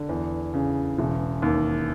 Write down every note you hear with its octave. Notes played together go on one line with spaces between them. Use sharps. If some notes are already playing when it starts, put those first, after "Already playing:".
Already playing: D3
E2
C#3
E1
D#2